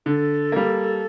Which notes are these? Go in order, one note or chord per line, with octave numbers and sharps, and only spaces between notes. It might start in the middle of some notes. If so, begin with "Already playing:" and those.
D3 A4
G3 A#3